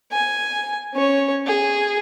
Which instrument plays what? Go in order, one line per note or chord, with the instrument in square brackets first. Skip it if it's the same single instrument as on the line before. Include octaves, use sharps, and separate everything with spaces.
[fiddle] G#5
C#4 C#5
G#4